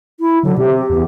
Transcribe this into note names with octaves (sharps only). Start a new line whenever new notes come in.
E4
D3 F#3
C3 G4
E2